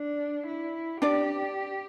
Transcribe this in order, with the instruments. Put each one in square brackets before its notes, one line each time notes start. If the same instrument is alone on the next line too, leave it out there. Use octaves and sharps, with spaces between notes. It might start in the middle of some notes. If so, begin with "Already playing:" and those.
Already playing: [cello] D4
E4
[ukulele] D4 D5 [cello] G4